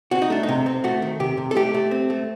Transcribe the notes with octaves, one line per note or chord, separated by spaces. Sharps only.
C4 F#4
D#4
A3 D4
D#4
C3
C4
A3 F#4
D#3
C3 G4
C3
A4
A3 G4
A3
C4
A3